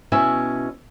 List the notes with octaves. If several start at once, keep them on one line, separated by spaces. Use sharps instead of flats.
B2 C#4 E4 E5 G#5